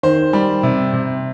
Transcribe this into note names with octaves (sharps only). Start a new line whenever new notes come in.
D#3 C5
G3
C3
C3